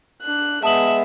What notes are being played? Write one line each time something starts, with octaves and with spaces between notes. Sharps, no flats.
D4 F#6
G#3 B3 E5 A5 D#6 F#7